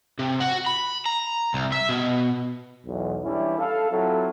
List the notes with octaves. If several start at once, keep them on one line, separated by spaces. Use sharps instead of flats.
C3
F#4
B5
A#5
C2
E5
B2
B1 E2
E3 G3 C#4 D4 E4
A4 F5
F#3 C4 E4 F4 A4